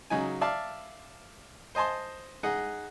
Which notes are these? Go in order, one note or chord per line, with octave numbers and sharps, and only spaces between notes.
C#3 F#3 D#4 G#5
D5 E5 F5 A5
C5 D#5 G#5 A5 C6
D#4 G#4 D#5 F#5